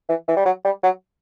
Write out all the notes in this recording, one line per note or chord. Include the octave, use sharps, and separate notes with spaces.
E3
E3
G3
F#3
G3
F#3